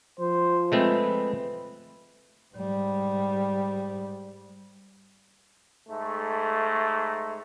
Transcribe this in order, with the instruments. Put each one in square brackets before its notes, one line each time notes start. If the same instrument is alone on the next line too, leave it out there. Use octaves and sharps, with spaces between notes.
[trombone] F3 [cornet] C5
[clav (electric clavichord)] G#3 A3 C4 [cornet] B4
[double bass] G#2 G3
[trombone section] G#2 A3